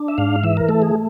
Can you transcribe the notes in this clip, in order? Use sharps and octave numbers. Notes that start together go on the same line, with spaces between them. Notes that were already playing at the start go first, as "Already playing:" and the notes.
Already playing: D4
E5
G#2 F5
E3 E5
A#4
A3 A4
G#4